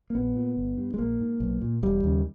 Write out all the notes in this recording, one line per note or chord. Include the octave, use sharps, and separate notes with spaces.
A#3
A#1 B3
A#2
G1
G2
G#3
A#1 A#3
G#2
B1
A#2
E1 G3
D#2 C#3